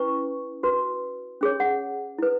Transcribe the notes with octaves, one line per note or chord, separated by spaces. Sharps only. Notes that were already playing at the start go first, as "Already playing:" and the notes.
Already playing: C#4 E4 B4 C#6
F#4 B4
C#4 G#4 C#5
F#5
E4 B4